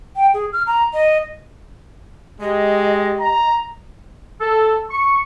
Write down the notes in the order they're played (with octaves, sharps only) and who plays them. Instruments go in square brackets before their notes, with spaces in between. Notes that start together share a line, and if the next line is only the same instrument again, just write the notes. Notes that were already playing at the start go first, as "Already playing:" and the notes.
[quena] G5
G#4
F6
A#5
D#5
[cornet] G#3 [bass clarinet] G4 [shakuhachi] D#5
[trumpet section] A#5
[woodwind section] A4
C#6